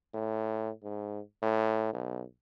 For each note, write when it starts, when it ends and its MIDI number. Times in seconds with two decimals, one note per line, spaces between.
0.14 0.70 45
0.83 1.20 44
1.42 1.92 45
1.94 2.24 35